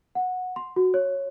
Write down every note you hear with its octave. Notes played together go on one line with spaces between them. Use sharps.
F#5
C6
F#4
C#5